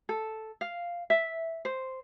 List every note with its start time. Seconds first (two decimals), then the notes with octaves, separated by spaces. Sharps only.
0.09 A4
0.61 F5
1.10 E5
1.65 C5